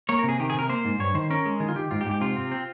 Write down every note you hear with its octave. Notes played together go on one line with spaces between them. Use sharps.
A#3 C#5
C3 A#4
G#4
D#3 G4
G#4
C3 A#4
A#3 C5
G#2
G2 C#5
D#3 C5
C#4 A#4
G#3
D#3 G#4
F4
D#3 G4
G#2 F4
G4
G#2
G4
C3 F4
C4
C4